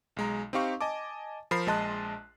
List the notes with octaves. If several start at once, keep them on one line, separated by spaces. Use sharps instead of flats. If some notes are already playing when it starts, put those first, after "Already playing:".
B1 G#3 A#5
C4 D#4 G4 F5 C#6
D#5 G#5 A5 D6
F3 A#4 B5 C7
A#1 G#3 D#5 A5 C6 F#6